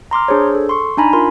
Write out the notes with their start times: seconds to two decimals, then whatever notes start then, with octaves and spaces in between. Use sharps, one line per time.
0.11 A#5 C6 D6 F6
0.28 D4 G#4 C5 C#5
0.55 A4
0.69 C6 C#6
0.97 D4 D#4 G#5 A#5 B5
1.13 D4 F4 A#4 C6